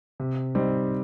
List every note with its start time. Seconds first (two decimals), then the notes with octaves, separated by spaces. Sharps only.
0.20 C3
0.55 G3 C4 D#4